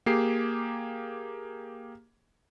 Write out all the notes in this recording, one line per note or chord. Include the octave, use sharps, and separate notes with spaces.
A#3 G4 G#4 C7